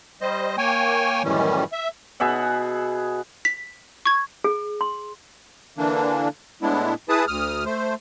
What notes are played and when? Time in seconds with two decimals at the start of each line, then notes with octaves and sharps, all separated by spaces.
0.21 G3 C5 D#5
0.58 A#3 C#5 G5 G#5
1.24 F#2 A2 D#3 E3 G3 C#4
1.72 E5
2.20 B2 G#4 E5 F#5
3.45 B6
4.06 C#6 G#6
4.44 G#4
4.81 C6
5.78 D3 E3 A#3 D4
6.62 A2 G#3 B3 D4 E4
7.09 E4 G#4 B4 A5 D#6
7.28 D2 D#6 F6
7.66 A3 C5